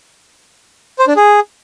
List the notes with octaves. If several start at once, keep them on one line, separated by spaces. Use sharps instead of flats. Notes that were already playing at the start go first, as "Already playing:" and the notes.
C5
D4
G#4